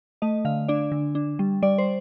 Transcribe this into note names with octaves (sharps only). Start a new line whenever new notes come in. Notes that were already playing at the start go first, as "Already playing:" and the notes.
A3 D#5
D3 F5
D4 D5
D3
D4
G3
G3 D5
C5